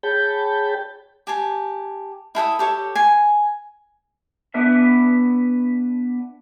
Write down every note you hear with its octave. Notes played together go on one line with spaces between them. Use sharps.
G#4 C#5 G5 A5 B5 G6
G4 G#5 A5
E4 A4 G5 D#6
G4 A4 C#5
G#5
B3 D4 B4 E5